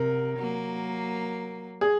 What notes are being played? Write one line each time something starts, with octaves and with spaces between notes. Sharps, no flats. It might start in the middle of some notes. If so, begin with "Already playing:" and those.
Already playing: C3 A#4
F#3 A#3
G#4